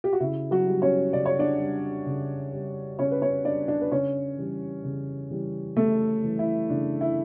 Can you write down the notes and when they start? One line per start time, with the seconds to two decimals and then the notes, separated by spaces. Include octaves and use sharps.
0.04 G4
0.13 F#4
0.20 C#3 E4
0.51 F#3 F#4
0.66 G3
0.82 C#4 C#5
1.13 C#3 D5
1.26 C#5
1.39 D4 D5
1.59 G3
2.06 C#3
2.52 G3
2.99 C#3 C#4 C#5
3.11 B4
3.22 C#4 C#5
3.45 G3 D4 D5
3.68 D4 D5
3.81 B4
3.91 C#3 C#4 C#5
4.38 E3 G3
4.84 C#3
5.30 E3 G3
5.77 C#3 A3 A4
6.24 E3 G3
6.39 E4
6.70 C#3 D4
7.01 E4